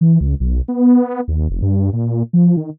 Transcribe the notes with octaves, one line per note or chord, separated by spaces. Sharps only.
E3
C#2
B1
B3
D#2
F1
G2
A#2
F3
D#3